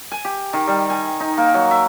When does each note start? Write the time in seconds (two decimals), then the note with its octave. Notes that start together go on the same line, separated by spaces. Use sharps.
0.11 G#5
0.25 G4
0.53 D#3
0.67 G3
0.90 G#5
1.20 D#4
1.37 A#3
1.54 F#3
1.71 E5